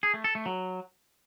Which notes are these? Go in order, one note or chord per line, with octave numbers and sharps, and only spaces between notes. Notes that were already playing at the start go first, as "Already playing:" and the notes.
G#4
A3
A4
A3
F#3